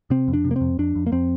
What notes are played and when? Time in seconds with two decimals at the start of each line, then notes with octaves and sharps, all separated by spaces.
0.10 C3 C4
0.28 F2
0.33 D4
0.44 C3
0.51 A#3
0.56 C4
0.61 F2
0.79 F2 D4
0.96 F2
1.06 A#3
1.12 F2 C4